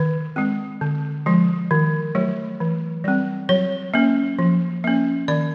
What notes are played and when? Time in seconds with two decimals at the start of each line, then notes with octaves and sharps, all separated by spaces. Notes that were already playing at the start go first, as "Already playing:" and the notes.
Already playing: D#3 B4
0.36 G#3 C4
0.81 D3
1.26 F3 G#3
1.71 D#3
2.15 F#3 A3
2.60 E3
3.04 G3 C4
3.49 F#3 C#5
3.94 A#3 C#4
4.39 F3
4.84 A#3 C#4
5.28 D#3 D5